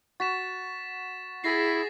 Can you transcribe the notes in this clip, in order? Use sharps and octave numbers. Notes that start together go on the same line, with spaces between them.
F#4 A6 B6 E7
E4 G#4 A6 A#6 C7